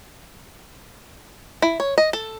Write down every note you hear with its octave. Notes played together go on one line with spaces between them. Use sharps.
E4
C#5
D#5
A4